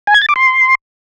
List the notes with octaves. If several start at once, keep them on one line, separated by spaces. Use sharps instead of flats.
G#5
G#6
A6
D6
C6